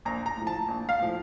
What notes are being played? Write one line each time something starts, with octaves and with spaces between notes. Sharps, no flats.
A#1 A#5
A#5
A2 F3
A5
A#1
F5
A2 F3